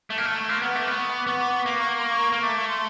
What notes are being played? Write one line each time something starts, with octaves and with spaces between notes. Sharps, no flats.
A3 A5
A#3
A3
C#6
A#3 C6
B3 C#6
A3 D6
B3 C#6
D6
B3 C#6
D6
C#6
A#3 D6
C#6
C6
C#6
A#3
A3 D6
C#6
C6